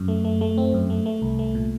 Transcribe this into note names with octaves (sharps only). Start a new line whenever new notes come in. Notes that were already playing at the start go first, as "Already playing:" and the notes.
Already playing: F#2
A3
A3
A3
C4
F#2
A3
A3
C2
A3
A#2